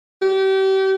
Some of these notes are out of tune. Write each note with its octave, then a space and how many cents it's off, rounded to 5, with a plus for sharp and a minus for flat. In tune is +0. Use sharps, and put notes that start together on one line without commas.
G4 -35